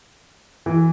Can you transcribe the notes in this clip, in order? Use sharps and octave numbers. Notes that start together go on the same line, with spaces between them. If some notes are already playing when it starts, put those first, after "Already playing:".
E3